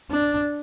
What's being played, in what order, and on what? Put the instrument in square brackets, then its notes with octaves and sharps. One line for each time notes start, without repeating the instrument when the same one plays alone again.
[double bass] D4